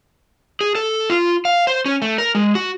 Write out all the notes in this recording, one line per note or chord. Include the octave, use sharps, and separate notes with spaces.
G#4
A4
F4
F5
C5
C#4
A3
A#4
G#3
F#4